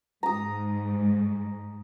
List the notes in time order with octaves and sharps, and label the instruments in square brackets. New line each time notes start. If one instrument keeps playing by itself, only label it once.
[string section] G#2 [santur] A#5 D#6